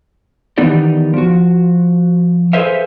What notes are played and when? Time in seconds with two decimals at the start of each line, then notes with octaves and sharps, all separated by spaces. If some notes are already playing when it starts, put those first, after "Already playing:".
0.58 D#3 E3 B3 D#4 G4 D5
1.14 F3 F#4
2.53 G#4 A4 B4 C5 E5 F5